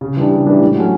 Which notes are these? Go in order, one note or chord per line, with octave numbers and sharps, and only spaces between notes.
C#3
E3 G3 D4
C#3
E3 G3 D4
A2
F#3 A3 C#4